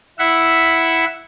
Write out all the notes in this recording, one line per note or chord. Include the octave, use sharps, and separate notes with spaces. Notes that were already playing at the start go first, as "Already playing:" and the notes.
E4 E5 F#5